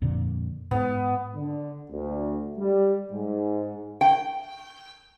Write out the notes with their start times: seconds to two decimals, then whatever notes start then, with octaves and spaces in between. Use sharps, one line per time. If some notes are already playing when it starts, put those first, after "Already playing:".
0.02 F2 A#2 D3
0.71 G#2 B3
1.35 D3
1.89 D2
2.58 G3
3.12 G#2
4.01 G5